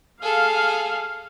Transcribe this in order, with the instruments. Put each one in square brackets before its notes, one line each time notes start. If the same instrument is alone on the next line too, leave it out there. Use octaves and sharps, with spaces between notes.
[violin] G#4 A4 [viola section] F5